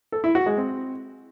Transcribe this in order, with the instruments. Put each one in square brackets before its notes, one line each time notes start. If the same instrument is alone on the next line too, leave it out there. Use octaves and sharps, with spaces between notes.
[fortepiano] A4
E4
F#4
G#3
C4